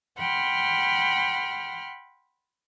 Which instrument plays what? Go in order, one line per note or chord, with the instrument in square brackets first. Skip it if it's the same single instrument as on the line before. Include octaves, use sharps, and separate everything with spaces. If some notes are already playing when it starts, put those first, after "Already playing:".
[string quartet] F#5 G5 B5 C6 F6